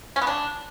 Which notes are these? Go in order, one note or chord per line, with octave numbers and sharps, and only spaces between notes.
C#4
B3
D4